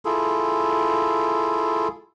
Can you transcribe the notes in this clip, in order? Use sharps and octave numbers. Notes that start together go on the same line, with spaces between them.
E4 F4 G#4 A4